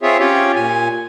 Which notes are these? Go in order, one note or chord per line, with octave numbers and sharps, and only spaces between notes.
C4 F4 G#4 C#5 E5
C#4 F4 G4 C#5
A#2 G#5